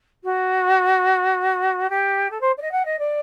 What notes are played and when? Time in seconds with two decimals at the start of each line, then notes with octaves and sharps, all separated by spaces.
0.24 F#4
1.90 G4
2.31 A4
2.41 C5
2.58 D5
2.62 D#5
2.72 F#5
2.85 D#5
2.99 D5